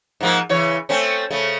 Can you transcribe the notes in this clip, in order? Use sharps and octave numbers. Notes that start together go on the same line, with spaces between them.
G#2 F3 A#3
C#3 E3 C#5
A3 C4 C#4
C#3 A3